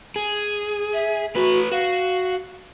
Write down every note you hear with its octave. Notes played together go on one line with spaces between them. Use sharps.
G#4
E5
A3 F#4 B4
F#4 F5